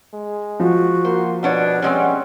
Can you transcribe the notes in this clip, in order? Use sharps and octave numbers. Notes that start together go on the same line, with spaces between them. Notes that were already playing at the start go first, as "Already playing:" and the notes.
G#3
F3 F#4
A#3 C5
B2 G3 D4 C#5 F#5
G3 G#3 C4 C#4